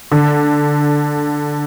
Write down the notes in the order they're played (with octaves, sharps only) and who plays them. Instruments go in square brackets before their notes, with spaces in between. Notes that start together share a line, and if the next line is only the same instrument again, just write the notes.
[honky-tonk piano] D3